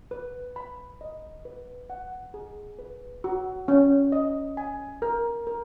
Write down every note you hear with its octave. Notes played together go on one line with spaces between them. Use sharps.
B4
B5
D#5
B4
F#5
G#4
B4
F#4
C#4
D#5
G#5
A#4
A#4